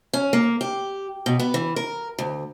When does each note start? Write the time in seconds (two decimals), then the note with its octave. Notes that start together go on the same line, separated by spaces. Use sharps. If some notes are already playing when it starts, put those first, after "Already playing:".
0.13 C#4
0.33 A#3
0.61 G4
1.26 B2
1.40 B3
1.54 E3
1.76 A#4
2.19 D2